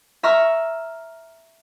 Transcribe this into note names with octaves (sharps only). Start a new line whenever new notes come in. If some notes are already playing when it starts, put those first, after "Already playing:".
E5 A#5 C#6 F6